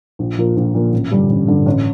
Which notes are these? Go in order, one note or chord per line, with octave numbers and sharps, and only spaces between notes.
A#1
A#2 F3 A#3 F4
A#1
A#2 F3 A#3 F4
A1
G2 D3 G3
A1
G2 D3 G3
A1